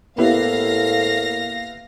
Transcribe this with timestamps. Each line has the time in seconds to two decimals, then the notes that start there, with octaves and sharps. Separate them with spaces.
0.18 A2 A#3 B3 E4 G4 F5 A#6